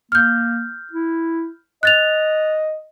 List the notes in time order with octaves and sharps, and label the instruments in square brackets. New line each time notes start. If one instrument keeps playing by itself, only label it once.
[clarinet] A#3 [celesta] F6 G6
[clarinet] E4
[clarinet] D#5 [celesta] F#6 A6 F7